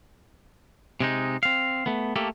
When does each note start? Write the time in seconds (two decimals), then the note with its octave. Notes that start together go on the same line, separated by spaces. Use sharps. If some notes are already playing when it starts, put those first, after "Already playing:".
1.00 C3 G#3 D#4
1.43 C4 F5
1.86 A3 B3
2.16 A3 A#3 G4 A4